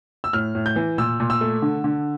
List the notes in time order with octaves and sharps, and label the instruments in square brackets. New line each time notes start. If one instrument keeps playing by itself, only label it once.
[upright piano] E6
A2 F6
A2
G6
E3
A#2 E6
A#2
E6
A3
D3
D3